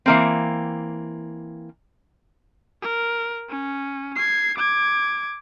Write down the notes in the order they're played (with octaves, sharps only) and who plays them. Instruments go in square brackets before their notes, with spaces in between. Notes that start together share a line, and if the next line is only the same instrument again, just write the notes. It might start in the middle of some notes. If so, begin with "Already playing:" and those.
[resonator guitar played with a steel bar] E3 A#3 C4
[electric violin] A#4
C#4
G#6 C7
D6 G#6